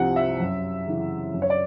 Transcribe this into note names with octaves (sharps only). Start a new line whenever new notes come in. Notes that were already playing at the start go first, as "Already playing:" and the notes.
Already playing: C2 C3 F3 F#5
E5
F#2
C#3 E3
F#2
C#5
D5